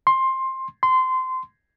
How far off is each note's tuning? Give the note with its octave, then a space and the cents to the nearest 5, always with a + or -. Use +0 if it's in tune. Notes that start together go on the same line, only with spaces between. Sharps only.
C6 +15
C6 -20